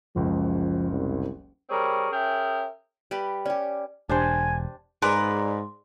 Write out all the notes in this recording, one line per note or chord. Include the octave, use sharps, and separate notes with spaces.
F#1 C#2 F3
C2
G3 C4 G#4 A#4 C#5
C#4 G#4 A#4 E5 G5
G3 G4 B4
C#4 G4 D5
E1 D4 G4 C5 G#5
G#2 G#4 A#4 B4 D5 C6